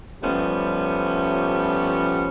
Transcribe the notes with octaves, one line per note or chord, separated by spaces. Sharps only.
F3 G3 A3 B3 C#4